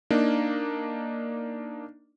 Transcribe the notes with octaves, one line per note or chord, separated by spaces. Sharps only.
A#3 D4 D#4